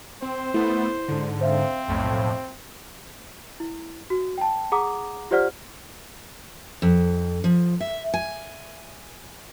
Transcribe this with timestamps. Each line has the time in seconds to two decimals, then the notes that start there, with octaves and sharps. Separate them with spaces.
0.22 C4 C5
0.54 A3 B3 E4
1.08 G#2 D3
1.41 C4 C5 E5 F5
1.88 B1 F2 A2
3.60 E4
4.10 F#4
4.38 G5 A5
4.72 G#4 F#5 A#5 D6 D#6
5.31 F4 G4 C5 D5 F#5 F6
6.82 F2
7.44 F3
7.81 E5
8.14 G#5